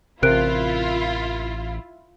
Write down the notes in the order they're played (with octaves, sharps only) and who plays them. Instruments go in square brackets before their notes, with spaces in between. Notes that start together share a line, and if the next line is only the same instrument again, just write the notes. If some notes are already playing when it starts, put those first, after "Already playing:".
[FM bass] A1 [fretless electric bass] C3 [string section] E4 F4 [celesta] A#4 F#6 D7